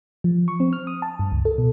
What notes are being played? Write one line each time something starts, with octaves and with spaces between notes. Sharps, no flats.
F3
C#6
C4
F6
D#6
A5
G2
C#2
A4
B2